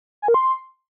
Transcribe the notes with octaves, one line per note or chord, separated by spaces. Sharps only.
G#5
A#4
C6